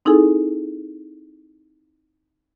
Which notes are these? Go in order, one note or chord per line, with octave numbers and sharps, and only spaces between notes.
C4 D#4 E4 G#4 A4 G#5